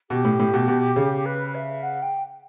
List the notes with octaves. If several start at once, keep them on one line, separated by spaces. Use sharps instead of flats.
B2 G4
A2
A2
B2
B2
C#3
B4
E5
F#5
G5